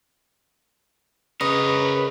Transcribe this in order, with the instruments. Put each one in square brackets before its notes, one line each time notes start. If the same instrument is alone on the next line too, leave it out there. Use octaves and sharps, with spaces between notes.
[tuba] C#3 [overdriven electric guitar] A#4 C#5 [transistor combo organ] B4 [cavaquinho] D#5